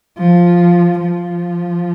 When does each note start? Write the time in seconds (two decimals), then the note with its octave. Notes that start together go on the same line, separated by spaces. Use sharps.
0.18 F3
1.01 F3